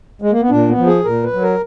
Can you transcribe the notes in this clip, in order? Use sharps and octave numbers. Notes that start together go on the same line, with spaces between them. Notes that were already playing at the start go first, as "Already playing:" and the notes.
G#3
A#3
B3
A#2 D4
B3
F3
G#4
A#2 A#4
B4
F#3
A#4